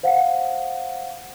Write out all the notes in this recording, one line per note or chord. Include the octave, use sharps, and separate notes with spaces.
C5 F5 F#5